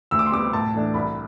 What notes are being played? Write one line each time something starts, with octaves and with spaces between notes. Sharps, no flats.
D2 E6
D6
C6
C3 G3 B3 D6
A2 A5
E3 A3 D4
C2 B5